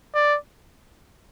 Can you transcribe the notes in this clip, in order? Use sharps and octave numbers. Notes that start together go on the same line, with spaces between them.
D5